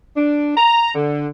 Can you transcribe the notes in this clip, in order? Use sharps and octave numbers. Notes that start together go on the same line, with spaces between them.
D4
A#5
D3